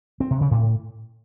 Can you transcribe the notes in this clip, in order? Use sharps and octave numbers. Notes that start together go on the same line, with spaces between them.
C4
C3
C#3
A2